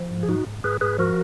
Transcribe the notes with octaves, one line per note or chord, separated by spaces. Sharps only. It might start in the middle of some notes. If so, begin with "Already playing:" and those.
Already playing: F3
G#2
G#4
G#2 D#4 F#4
G#2
G#2 G#4 B4
G#2 G#4 B4
F3 F#4 A#4